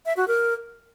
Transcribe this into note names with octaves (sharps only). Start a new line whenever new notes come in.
E5
F#4
A#4